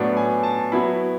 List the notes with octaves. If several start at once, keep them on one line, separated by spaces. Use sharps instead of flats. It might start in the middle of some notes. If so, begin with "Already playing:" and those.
Already playing: A2 F#3 B3 D4
G#5
A5
F#3 B3 E4 B5